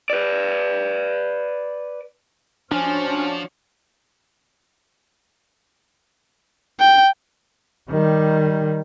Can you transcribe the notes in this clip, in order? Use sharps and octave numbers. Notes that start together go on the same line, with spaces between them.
B4 D5
F3 C#4 D4 F#4 C5 C#5 G#5 F6
G5
D#3 G3